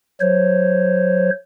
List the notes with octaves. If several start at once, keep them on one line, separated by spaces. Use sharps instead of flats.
F#3 C5 C#5